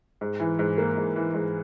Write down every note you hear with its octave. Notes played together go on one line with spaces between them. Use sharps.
G#2
E3
G#2
A#3
G#2
E3
G#2